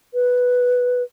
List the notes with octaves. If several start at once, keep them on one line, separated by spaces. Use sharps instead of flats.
B4